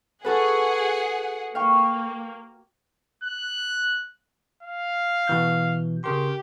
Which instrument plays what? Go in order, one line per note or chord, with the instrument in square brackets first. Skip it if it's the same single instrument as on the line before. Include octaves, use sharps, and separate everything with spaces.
[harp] F#4 A4 B4 [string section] G#4 F#5
[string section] A#3 [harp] F5 G5 C#6
[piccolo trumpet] F#6
F5
[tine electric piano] B2 E3 G6
[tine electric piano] C#3 A#4 C6 [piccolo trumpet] G4